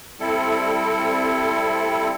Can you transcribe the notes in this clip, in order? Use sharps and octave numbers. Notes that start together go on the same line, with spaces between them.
G3 C4 E4 A4